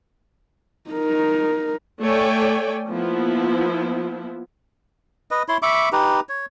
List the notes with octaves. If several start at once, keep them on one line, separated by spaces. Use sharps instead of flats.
D#4 A#4
A3 C#5 D5 G5 G#5
F3 A#3 B3 E4
B4 D#5
E4 C#5 C6
E5 B5 C#6 D6
D#4 G4 B4
C#5